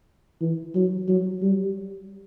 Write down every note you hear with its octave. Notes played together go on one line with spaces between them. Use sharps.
E3
F#3
F#3
G3